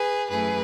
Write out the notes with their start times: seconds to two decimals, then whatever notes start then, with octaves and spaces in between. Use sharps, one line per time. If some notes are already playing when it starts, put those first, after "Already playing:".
Already playing: G#4 B4
0.29 F#2 E3 A3 G#4 B4